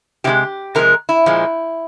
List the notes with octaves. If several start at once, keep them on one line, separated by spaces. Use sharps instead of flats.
C3 F3 G#3 G4
C3 F3 G#3 A#4
E4
A#2 F3 G#3